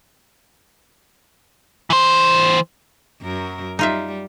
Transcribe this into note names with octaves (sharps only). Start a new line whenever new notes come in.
E3 C5
F#2 F#3 A#4
G3 D#4 F4 E5